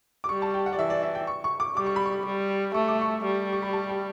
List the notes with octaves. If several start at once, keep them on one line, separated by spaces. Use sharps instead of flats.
D6
G3 C#6
A5
G5
F#5
D5
E3 E5
D5
E5
G5
C#6
C#6
D6
G3 D6
C#6
B5
C#6
G3
A3 C#6
D6
C#6
G3
C#6
B5
A5
G5